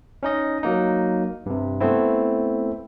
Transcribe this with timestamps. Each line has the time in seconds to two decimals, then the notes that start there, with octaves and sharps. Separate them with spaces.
0.23 C#4 D#4 D#5
0.63 F#3 A#3 D#4
1.46 G2 C3
1.80 A3 B3 C4 E4